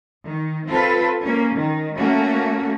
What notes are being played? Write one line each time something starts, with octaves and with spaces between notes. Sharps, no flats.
D#3
C4 F4 A4 B4
A#3 C#4
D#3
A3 A#3 C#4 F#4